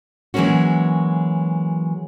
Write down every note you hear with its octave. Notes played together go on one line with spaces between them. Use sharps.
E3 F#3 G#3 A#3 C#4 F#4